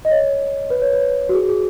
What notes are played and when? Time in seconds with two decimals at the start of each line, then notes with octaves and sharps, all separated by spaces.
0.05 D#5
0.11 C#5
0.70 B4
0.82 C#5
0.93 B4
1.29 F#4
1.34 G#4
1.39 F#4
1.49 G#4